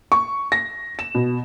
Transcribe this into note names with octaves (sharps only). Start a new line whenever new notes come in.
C#6
A#6
E7
B2